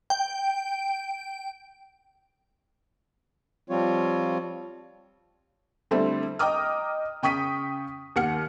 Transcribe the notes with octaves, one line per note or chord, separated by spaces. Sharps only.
G5
F3 G3 C4 F4 C#5
D3 G3 A3 C4 E4
D#5 G5 A#5 D6 D#6 F6
C#3 G5 C#6 D#6 B6 D#7
D#2 G4 F#5 F6 C#7